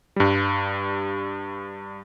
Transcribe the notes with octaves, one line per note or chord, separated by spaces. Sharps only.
G2 G3